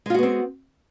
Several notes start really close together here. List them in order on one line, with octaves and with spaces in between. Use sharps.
G#3 F4 F#4 B3 C4